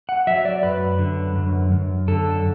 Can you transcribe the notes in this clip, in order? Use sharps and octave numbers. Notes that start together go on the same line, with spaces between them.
F#5
F#3 E5
D5
F#2 B4
D3
F#2
F#2
D3 A4